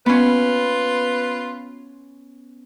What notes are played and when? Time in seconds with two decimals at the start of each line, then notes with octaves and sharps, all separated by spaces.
0.06 B3 C#4 F4 B4